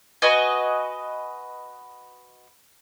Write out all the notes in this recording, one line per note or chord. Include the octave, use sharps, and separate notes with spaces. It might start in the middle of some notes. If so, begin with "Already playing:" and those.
F#4 B4 D#5 G#5